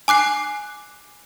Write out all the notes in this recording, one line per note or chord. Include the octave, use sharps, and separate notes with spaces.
G#5 D6 F#6 C7